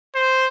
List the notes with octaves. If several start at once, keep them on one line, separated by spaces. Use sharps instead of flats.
C5